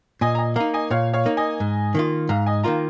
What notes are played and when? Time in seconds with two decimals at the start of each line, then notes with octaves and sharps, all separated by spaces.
0.21 A#2 D#5 G#5
0.35 A#5
0.39 D#5 G#5
0.56 A#3 D#4 F5 A#5
0.74 D#5 G#5
0.91 A#2 C#5 F5
1.13 C#5 F5
1.26 A#3 D#4
1.37 D#5 G#5
1.60 G#2
1.95 D#3 A#3 F4
2.29 G#2 F5 A#5
2.46 D#5 G#5
2.64 D#3 A#3 F4 F5 A#5